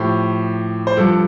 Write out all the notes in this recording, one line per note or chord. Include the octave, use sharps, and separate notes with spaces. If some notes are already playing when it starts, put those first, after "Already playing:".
Already playing: A2 F3 G4 C5
C5
G2 F3 A4